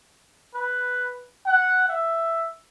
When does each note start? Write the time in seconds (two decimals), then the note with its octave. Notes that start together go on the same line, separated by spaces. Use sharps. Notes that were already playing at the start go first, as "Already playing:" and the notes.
0.54 B4
1.46 F#5
1.88 E5